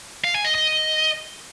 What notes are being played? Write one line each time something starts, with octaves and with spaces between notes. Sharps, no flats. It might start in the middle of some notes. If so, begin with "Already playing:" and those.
F5
G#5
D#5
D#5